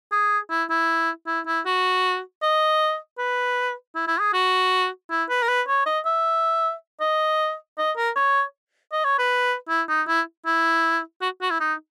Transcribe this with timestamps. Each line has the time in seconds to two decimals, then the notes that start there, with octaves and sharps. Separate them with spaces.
0.12 G#4
0.50 E4
0.70 E4
1.27 E4
1.47 E4
1.66 F#4
2.42 D#5
3.18 B4
3.95 E4
4.07 E4
4.20 G#4
4.33 F#4
5.10 E4
5.29 B4
5.42 A#4
5.48 B4
5.68 C#5
5.86 D#5
6.06 E5
7.00 D#5
7.78 D#5
7.97 A#4
8.15 C#5
8.92 D#5
9.05 C#5
9.18 B4
9.69 E4
9.89 D#4
10.07 E4
10.46 E4
11.22 F#4
11.42 F#4
11.50 E4
11.60 D#4